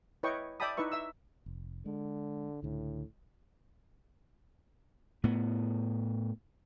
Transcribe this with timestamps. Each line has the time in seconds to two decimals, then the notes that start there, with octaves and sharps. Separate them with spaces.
0.23 E4 B4 C#5 D#5 G5 C#6
0.60 D5 E5 G5 A5 B5 D#6
0.77 D#4 E4 B4 E5 C#6
0.92 E5 E6
1.46 F1
1.86 D3 G#3
2.63 C#2 A2 D3
5.24 A2 B3